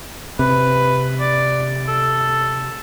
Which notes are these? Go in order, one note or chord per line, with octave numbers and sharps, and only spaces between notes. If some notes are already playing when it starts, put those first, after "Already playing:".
C3 B4
D5
A4